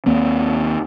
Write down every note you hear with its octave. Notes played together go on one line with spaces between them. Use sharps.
D#2 A#3 C4